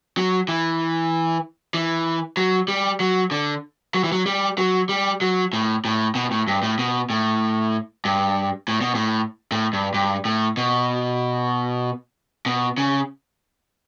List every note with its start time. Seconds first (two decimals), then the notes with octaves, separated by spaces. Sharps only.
0.17 F#3
0.48 E3
1.74 E3
2.37 F#3
2.68 G3
3.00 F#3
3.31 D3
3.94 F#3
4.04 E3
4.12 F#3
4.26 G3
4.58 F#3
4.89 G3
5.21 F#3
5.53 A2
5.85 A2
6.15 B2
6.31 A2
6.48 G2
6.63 A2
6.79 B2
7.10 A2
8.05 G2
8.68 A2
8.81 B2
8.95 A2
9.52 A2
9.73 G2
9.94 G2
10.25 A2
10.57 B2
12.46 B2
12.78 C#3